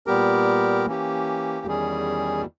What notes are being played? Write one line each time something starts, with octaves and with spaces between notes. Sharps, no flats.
A#2 G3 B3 G4 A#4
E3 A#3 C#4 G4
E2 D#3 G3 C#4 G#4